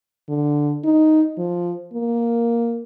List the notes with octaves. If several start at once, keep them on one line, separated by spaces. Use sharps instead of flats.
D3
D#4
F3
A#3